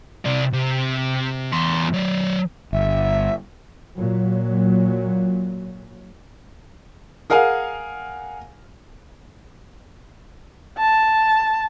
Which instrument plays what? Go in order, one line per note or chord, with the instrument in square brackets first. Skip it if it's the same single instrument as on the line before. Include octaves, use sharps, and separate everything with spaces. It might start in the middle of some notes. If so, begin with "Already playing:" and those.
[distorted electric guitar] C3 D5
C3
E2 C6
F#3 D5
[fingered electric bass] G1 [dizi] E5
[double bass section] A#2 F#3
[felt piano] G#4 A#4 F5 F#5 G#5
[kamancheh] A5